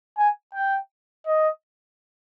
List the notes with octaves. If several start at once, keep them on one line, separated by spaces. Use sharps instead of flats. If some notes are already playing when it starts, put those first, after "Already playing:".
G#5
G5
D#5